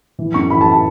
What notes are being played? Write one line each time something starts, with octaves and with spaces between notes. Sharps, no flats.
E3
F#2 C#6
E3 B5
A5
A5